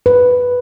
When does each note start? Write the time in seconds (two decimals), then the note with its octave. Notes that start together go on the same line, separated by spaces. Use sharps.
0.06 B4